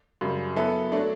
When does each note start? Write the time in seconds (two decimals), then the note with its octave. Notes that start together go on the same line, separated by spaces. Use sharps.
0.21 F#2 C#3 G3
0.56 F#3 B3 E4 A4
0.92 F#3 A3 D4